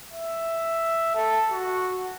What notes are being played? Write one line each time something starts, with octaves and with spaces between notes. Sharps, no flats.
E5
A4
F#4